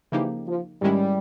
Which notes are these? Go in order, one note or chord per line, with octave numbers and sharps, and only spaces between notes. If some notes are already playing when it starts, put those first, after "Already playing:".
C#3 E3 F3 A#3 D#4 G4
F3
G#2 D#3 G3 G#3 C#4 E4